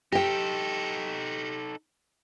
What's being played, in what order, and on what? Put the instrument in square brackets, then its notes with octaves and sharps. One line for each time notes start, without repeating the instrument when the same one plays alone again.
[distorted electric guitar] D#4 A4 [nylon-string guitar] G4 G5